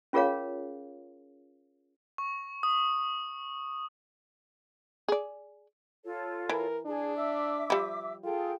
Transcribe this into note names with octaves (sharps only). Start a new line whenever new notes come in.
C#4 F4 G#4 A#4 C#5 F5
C#6
D#6
G#4 D5
F4 A4 C#5
E3 A#4
D4 G#4 A5
E5 D6 E6
F3 G3
F4 G#4 A4 G5